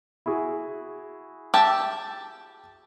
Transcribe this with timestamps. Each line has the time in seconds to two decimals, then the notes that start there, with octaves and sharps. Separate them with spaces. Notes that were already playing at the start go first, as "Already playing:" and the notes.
0.26 E4 F#4 G#4
1.54 G4 E5 A5